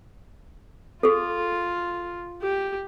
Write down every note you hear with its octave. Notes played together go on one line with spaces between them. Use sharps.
F4 G#4 A4
G4